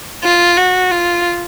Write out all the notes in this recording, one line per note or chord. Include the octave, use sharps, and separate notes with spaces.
F4
F#4
F4